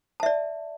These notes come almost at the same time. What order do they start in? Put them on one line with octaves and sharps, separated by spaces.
A5 E5 D5